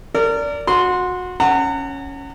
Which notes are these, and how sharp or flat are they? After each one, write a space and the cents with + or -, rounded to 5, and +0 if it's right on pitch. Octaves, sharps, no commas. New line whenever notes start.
A#4 -30 D5 -15
F#4 -25 C6 +0
C#4 +0 F#5 +10 A#5 -40